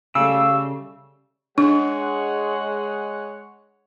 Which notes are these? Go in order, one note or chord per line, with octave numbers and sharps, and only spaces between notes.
C#3 G3 A3 F5 E6
G#3 D4 C#5 F#5